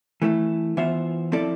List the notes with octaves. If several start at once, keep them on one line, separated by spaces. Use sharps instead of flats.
E3 A3 E4 A4
E3 B3 F4 C5 E5
F3 C4 E4 A4 D5